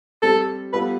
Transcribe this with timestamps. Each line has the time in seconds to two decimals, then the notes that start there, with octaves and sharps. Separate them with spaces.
0.23 G3 C4 G4 A4
0.73 G3 B3 F4 A4 B4